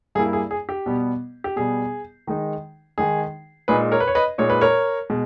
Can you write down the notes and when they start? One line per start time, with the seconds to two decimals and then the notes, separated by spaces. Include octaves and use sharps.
0.15 G2 G3 A#3 E4 G#4
0.33 G#4
0.51 G#4
0.69 G4
0.86 B2 G3 B3
1.44 G4
1.56 B2 G3 B3 G#4
2.27 D#3 G#3 D#4
2.98 D#3 G#3 D#4 G#4
3.68 A#2 G#3 D#4 G#4 B4
3.92 A#4 C#5
4.00 B4
4.07 C#5
4.15 B4 D#5
4.38 A#2 G#3 D#4 C#5
4.50 B4
4.61 A#4 C#5
5.10 B2 G#3